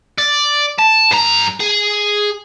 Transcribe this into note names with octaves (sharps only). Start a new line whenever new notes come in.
D5
A5
G2 A#5
G#4